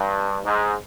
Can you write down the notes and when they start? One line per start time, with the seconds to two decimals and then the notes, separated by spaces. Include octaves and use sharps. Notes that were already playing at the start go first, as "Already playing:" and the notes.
Already playing: G2
0.45 G#2